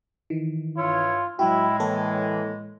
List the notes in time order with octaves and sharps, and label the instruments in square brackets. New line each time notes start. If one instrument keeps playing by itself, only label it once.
[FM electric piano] D#3 E3
[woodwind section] G2 E4 C#5 [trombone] F4
[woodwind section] A2 G#3 [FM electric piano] F#3 F#4 [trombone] E4 [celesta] G5
[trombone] E3 [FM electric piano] A#3 A4 C#5